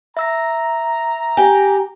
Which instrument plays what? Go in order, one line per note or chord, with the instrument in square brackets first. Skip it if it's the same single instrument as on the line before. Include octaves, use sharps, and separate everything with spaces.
[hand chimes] E5 E6 A#6 [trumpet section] A#5
[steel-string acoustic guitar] G4 G5 [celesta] G#5